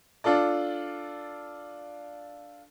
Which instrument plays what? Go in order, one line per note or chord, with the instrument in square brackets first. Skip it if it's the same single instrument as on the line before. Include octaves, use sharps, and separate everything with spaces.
[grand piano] D4 F4 A4 D5